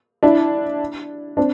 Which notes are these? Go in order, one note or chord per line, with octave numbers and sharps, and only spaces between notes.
D4 E4
C4 D4